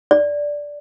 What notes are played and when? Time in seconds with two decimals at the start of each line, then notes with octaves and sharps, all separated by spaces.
0.11 D5